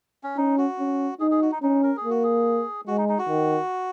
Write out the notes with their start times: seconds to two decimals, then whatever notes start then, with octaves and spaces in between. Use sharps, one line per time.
0.23 C#4
0.37 C#4 D#4
0.58 F#4
0.80 C#4
1.20 D#4 G#4
1.31 G#4
1.42 F#4
1.52 D#4
1.63 C#4 D#4
1.83 A#4
1.97 G#4
2.04 A#3
2.10 F#4
2.24 G#4
2.87 G#3 F#4
2.98 D#4
3.09 D#4
3.19 F#4
3.29 D#3